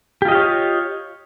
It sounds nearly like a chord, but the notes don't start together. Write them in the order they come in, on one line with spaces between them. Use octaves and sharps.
G4 F4 D#5 F5 C#5